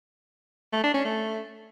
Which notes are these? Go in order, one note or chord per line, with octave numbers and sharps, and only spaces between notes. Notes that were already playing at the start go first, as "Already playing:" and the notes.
A3
D4
C#4
A3